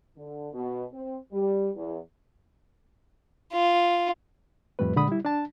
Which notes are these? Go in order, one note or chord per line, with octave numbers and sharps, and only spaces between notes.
D3
B2
C4
G3
E2
F4
F2 A2 G3 A3 B4
A#2 D3 G#3 B5 D#6
G3 E4
D4 A5